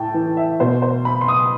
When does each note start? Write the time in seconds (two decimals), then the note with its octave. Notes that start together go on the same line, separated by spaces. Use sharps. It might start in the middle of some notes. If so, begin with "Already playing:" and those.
Already playing: A2 G5 A5
0.14 E3
0.37 E5
0.60 B2 C5
0.82 C5
1.05 B5
1.21 C6
1.28 D#6